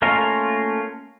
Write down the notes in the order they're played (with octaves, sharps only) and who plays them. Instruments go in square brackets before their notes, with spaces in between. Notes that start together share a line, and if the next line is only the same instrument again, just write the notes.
[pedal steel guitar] A3 A#3 C#4 F4 A#4